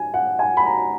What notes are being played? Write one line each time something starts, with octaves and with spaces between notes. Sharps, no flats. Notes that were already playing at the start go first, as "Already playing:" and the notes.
Already playing: G#5
F#5
G#5
B5
A#5